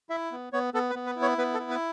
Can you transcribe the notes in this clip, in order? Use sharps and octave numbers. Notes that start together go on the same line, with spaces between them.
E4 E5
B3
B3 C#5
B3 A4
B4
B3
B4
E4
C#5
B3 B4
A4
E4
B4